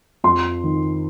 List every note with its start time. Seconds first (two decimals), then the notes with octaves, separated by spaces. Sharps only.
0.24 F2 C6
0.64 D#3